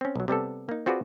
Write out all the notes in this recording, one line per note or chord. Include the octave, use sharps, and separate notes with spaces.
C4 C#4
B1 F#3
C3 G3 B3 A4
A#3 D#4
C4 F4 F#4 G#4 B4 D5